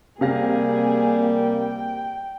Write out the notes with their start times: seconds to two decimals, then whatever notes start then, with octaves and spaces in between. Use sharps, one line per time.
0.21 C3 G3 A#3 G#4 F5 A#6
1.23 G5